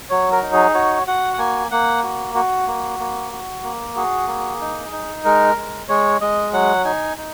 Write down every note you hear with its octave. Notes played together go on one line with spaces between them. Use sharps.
F#3 C#5
A#4
D#4
G#4
F#4 C#5
F#4 F#5
F#5
A#3 G#5
A#3 F#5
F#4
F#4
A#3
A#3
F#4
A#3
F#4 G#4
A#3
D#4
D#4
G#3 A#4
G#3
G#3 C#5
G#3 D#5
F#3 F#5
D#4 G#5
D#4